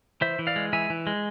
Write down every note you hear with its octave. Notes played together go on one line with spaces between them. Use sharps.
E3 C5 E5
E3
D5 F5
G#3
E3 E5 G#5
E3
G#3